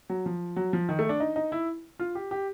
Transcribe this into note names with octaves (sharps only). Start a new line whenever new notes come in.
F#3
F3
F#3
F3
D#3
A3
D4
D#4
D#4
E4
F4
G4
G4